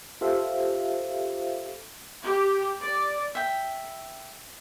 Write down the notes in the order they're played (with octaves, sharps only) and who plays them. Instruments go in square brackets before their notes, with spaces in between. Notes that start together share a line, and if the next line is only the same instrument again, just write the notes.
[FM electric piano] F4 G4 A4 C5 E5 F5
[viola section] G4
D5
[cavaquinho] E5 G5